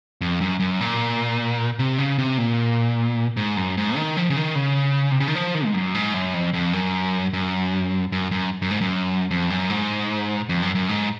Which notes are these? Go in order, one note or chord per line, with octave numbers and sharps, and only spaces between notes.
F2
F#2
F#2
A#2
C3
C#3
C3
A#2
G#2
F#2
G#2
D#3
F3
C#3
D#3
C#3
C3
C#3
D#3
F3
D#3
G#2
F#2
G#2
F#2
F2
F2
F#2
F#2
F#2
F#2
F#2
G#2
F#2
F2
F#2
G#2
F2
F#2
F#2
G#2